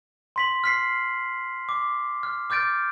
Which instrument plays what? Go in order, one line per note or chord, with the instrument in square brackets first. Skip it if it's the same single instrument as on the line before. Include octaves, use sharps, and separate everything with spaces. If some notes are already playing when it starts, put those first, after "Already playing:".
[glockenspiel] C6 B6 F#7
F6 B6 C7
D6
F6
D6 F6 G6 A6 D7